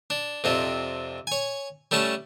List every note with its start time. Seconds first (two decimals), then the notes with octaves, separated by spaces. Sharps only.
0.10 D4
0.44 F2 C3 D4
1.27 C#5 G#5
1.91 G3 A3 C#4 A5